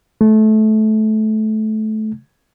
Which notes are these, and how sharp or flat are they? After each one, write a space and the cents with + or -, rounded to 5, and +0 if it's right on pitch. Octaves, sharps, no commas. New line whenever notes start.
A3 -20